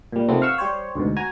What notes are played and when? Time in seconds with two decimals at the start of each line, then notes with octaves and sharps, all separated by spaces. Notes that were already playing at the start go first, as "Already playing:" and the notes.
0.12 A#2 G3
0.28 C3 D#3 F3 A3 B3 C4
0.42 F5 F#5 C#6 E6
0.58 G3 G4 C5 C#5
0.95 D2 G#2 B2
1.16 F#4 G#5 A#5